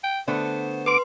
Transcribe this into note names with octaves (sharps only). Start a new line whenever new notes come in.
G5
D3 A3 B3 C5
B4 C6 D6